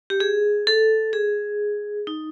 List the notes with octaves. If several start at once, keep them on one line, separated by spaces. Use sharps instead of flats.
G4
G#4
A4
G#4
D#4